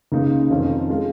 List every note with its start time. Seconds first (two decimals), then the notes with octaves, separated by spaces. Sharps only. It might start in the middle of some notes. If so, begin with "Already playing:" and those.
0.12 C#2 C#3 A#3 D#4
0.50 F1 F2 D#3 C#4 F4
0.90 G#3 F4